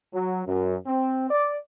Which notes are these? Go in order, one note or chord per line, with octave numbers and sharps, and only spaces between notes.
F#3
F#2
C4
D5